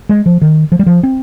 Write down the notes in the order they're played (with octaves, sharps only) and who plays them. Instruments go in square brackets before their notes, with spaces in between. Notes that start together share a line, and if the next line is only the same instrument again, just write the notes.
[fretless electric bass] G#3
F3
D#3
F3
G3
F3
C4